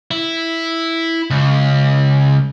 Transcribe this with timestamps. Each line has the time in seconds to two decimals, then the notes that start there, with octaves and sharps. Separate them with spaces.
0.11 E4
1.30 C#2